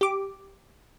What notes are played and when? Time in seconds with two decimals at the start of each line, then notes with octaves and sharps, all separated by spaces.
0.01 G4 D6